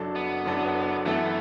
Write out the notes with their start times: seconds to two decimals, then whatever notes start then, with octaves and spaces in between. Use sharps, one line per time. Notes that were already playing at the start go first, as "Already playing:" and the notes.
Already playing: F#1 F#2 F#3 D4 A4
0.16 B3
0.46 F#1 F#2 F#3 D4 A4
1.05 F#2 E3 A3 B3 E4 A4